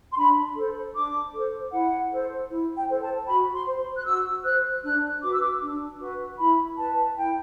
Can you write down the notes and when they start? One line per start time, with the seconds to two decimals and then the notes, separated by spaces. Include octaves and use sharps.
0.11 C6
0.16 D4 B5
0.55 A4 C5
0.94 D4 D6
1.33 A4 C5
1.72 E4 F#5
2.11 A4 C5
2.49 E4
2.76 G5
2.88 A4 C5
3.01 A5
3.27 F#4 B5
3.53 C6
3.66 C5
3.96 F#6
4.05 F#4 E6
4.44 C5 F#6
4.83 D4 F#6
5.22 F#4 B4 D6
5.31 E6
5.41 D6
5.61 D4
6.00 F#4 B4
6.38 E4 B5
6.78 B4 A5
7.17 E4 G5